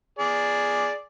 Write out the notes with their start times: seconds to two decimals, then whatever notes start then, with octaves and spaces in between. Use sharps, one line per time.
0.19 G#4 D5